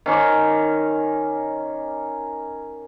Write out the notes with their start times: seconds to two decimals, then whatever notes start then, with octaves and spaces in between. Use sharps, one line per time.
0.06 D#3 C#4 D6